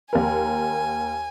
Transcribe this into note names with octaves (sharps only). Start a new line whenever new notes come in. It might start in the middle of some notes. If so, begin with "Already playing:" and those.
D#2 A#4 G#5